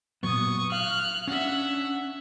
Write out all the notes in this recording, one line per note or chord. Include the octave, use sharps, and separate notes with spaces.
A#2 F#3 B3 C#6 D#6
F5 F6 F#6
C#4 D4 E5 F#5